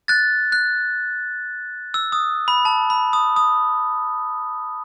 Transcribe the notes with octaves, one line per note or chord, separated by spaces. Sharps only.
F#6 A6
F#6
E6
D#6
B5
A5
B5
D#6
D#6